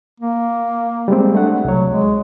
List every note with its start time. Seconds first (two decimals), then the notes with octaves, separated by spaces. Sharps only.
0.20 A#3
1.08 G3 G#3 C4
1.35 A3 D4 F#5
1.65 C2 F#3 C#5
1.90 G#3